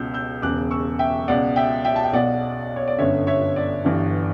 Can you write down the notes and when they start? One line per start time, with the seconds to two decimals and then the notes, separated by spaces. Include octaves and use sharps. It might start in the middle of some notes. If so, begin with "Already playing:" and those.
Already playing: C#2 B2 E6 G6
0.14 E6 G6
0.42 E1 E2 C#3 D6 F#6
0.71 C#6 E6
0.99 E5 G5
1.28 C#2 B2 D5 F#5
1.56 E5 G5
1.85 E5 G5
1.96 A5
2.04 G5
2.13 B1 B2 D5 F#5
2.76 C#5
2.88 D5
2.99 G1 F#2 D3 C#5 E5
3.27 C#5 E5
3.56 D5
3.85 G1 G2 E3